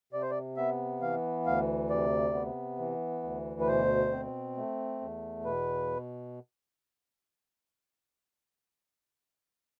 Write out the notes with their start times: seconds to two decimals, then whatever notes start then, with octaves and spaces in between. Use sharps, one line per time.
0.13 C3 D5
0.22 C5
0.31 D5
0.57 B3 E5
1.01 E3 F5
1.46 D2 F5
1.90 C3 D5
2.34 B3
2.79 E3
3.23 D2
3.61 B4
3.67 B2 C5
4.12 C4
4.57 A3
5.01 E2
5.45 B2 B4